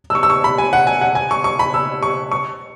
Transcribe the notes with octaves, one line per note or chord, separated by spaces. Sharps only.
E6
C#6
E6
C#6
B5
G#5
F#5
G#5
F#5
G#5
C#6
C#6
B5
E6
C#6
C#6